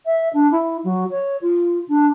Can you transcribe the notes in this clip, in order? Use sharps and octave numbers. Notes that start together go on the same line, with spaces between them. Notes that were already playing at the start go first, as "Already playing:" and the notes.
E5
D4
E4
F#3
C#5
F4
D4